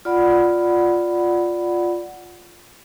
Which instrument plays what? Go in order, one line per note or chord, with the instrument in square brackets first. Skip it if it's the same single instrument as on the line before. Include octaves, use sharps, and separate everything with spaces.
[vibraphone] F4 D5 F#5 B5